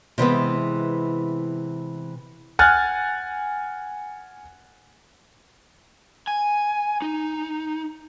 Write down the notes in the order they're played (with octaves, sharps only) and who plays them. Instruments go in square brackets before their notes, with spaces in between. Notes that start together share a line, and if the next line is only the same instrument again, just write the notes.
[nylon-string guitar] C3 E3 G#3 B3
[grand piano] F#5 G#5 F6 F#6 G#6 A6
[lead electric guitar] G#5
D#4